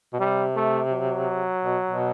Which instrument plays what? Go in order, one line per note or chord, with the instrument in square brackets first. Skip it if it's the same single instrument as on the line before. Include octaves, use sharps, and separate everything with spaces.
[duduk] B2
[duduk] C3 [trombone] G3
[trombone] A3
F#3
[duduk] B2
B2